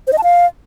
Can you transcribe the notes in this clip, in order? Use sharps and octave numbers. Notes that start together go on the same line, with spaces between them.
C5
D#5
A5
F5